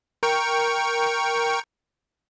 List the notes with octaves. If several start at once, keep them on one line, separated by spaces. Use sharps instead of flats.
A#4 G5 C#6